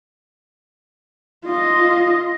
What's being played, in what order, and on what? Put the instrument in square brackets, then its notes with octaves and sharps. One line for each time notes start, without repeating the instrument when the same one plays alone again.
[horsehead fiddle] F4 D#5